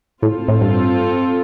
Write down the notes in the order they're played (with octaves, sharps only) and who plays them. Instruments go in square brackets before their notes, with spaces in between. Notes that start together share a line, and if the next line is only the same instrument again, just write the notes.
[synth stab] A2 [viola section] C4 F4 A4
[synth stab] A2
G2